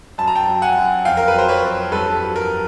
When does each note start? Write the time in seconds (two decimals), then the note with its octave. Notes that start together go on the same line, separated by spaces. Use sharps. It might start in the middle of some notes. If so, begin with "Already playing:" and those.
0.18 F#2 A5
0.27 A#5
0.35 G5 A5
0.48 F#3
0.62 F#5 G#5
0.76 F#2
1.05 F2 F5 G5
1.17 A#4
1.28 B4
1.34 F#3 C5
1.48 B4 C#5
1.63 F2
1.91 G2 A4 B4
2.21 F#3
2.36 A#4